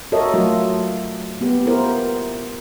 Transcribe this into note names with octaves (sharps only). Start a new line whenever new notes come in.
F#4 A4 A#4 C#5 D#5 E5
F#3 A3 F4
B3 G4
E4 F4 A#4 C5